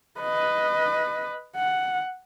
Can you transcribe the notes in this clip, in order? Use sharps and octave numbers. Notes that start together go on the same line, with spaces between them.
B4 D#5
F#5